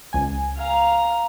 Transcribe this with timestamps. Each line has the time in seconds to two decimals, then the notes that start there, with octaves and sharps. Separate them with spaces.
0.13 C#2 G#5
0.58 F5 A#5